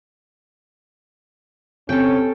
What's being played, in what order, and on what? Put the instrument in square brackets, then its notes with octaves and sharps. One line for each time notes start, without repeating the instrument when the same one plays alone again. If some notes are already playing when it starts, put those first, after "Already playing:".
[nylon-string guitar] C3 [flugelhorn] C#4 [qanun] A4 G5